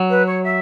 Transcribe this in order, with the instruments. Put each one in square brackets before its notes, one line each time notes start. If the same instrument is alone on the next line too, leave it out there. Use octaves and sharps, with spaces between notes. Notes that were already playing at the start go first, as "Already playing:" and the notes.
Already playing: [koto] F#3
[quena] B4
C#5
E5